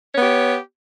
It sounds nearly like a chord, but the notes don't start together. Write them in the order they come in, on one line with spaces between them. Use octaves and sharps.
C#5 B3 G4